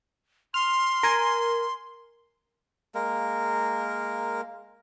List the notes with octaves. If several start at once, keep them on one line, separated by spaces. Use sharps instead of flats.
C6 F6
A#4 G#5
G#3 A#3 A#4